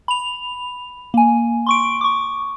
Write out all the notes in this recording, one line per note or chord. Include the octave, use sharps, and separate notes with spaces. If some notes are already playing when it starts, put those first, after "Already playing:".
B5 F7
A#3 G#5
C6 C#6 D7
C#6 D6